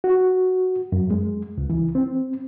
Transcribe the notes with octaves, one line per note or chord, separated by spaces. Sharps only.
F#4
F#2
G#3
C#2
E3
C4